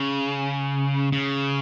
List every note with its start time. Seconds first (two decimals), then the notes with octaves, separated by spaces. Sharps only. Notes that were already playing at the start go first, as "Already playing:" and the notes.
Already playing: C#3
1.12 C#3